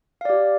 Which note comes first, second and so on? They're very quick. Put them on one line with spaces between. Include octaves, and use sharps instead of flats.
F5 D5 G4